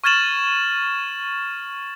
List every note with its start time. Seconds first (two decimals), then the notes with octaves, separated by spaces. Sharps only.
0.04 C#6 F6 G#6 A6 E7 F#7